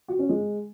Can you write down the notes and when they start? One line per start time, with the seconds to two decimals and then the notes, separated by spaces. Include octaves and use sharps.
0.08 F#4
0.19 C#4
0.29 G#3